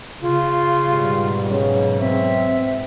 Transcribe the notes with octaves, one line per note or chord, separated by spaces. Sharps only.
C#3 F4
G#2 B2 G3
C#3 F#3
C4 E5